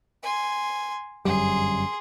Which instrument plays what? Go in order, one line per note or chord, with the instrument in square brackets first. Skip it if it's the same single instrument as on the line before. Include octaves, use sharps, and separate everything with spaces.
[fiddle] G#5 C6
[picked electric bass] G1 F#2 G3 [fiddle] G#4 C6